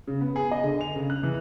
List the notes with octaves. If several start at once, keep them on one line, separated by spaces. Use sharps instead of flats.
C#3
B3
G#4
D#5
D3
F7
C#3
F#6
E3